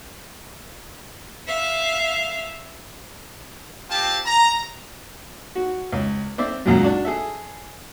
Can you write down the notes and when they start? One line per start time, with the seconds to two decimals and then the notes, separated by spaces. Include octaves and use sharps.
1.47 E5 F5
3.90 C4 F4 G4 G5 A5
4.26 A#5
5.55 F#4
5.93 C#2
6.38 C4 D5 E5
6.66 C#2 F#2 A#2 F#3
6.83 D4 F#4
7.05 G#4 A4 E5